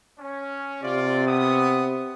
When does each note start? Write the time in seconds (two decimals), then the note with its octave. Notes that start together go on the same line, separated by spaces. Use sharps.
0.20 C#4
0.83 C3 F4 D5
1.27 B3 D#6